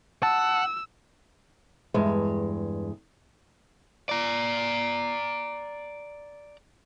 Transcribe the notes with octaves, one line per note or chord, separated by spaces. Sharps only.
F#5 A5 E6
E2 G2 G#3
D5 A#5